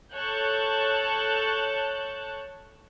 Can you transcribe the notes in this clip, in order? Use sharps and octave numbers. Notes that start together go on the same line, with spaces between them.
A4 C#5 A5 F#6 G6